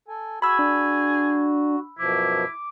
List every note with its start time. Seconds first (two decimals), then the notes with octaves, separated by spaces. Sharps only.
0.08 A4 G#5
0.42 F#4 G#4 B5 E6 G#6
0.59 D4
1.99 F#2 B2 F3 E4 D6